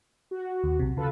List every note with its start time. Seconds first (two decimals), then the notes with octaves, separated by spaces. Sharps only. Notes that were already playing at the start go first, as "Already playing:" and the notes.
0.31 F#4
0.63 D#2
0.79 B1 C3
0.97 C#3 F4 A4 B4